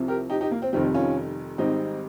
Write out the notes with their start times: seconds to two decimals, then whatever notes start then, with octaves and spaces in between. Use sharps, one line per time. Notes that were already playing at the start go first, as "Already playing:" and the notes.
Already playing: C2 C3 F3
0.08 G4 A#4
0.30 D#4 G4
0.41 D#4 G4
0.51 A#3
0.62 C4
0.73 F1 F2 D#3 G3 C4
0.94 C#4 F4
1.58 G#1 G#2 G3 C4 D#4